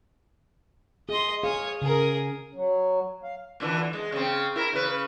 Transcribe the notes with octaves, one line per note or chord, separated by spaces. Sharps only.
G#4 D#5 C6
G#4 C#5 F5 G#5
C#3 G#4 A#4
F#3
F5
A#2 D3 E3
G#3
C#3 C4
E4 A#4
C#3 B4